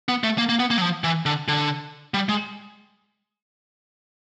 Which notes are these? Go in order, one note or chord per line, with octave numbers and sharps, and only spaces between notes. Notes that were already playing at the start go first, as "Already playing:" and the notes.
B3
A3
A#3
A#3
B3
A#3
F#3
F3
E3
D3
D3
G3
G#3